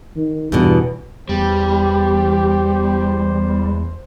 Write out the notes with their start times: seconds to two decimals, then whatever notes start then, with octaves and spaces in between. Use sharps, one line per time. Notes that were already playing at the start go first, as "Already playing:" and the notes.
0.16 D#3
0.52 E2 G2 B2
1.29 E2 G3 G4 C5